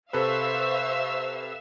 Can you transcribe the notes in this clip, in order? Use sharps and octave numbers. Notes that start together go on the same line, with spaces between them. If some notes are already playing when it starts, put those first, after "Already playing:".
C3 A4 B4 C5 E5 F5 C#6 E6